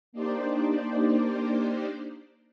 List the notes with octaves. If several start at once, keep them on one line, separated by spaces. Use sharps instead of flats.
A#3 D4 D#4 G4 C5 D5